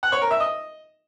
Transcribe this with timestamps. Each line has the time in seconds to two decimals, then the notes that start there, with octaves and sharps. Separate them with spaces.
0.03 F#5
0.12 C#5
0.21 A#4
0.31 E5
0.40 D#5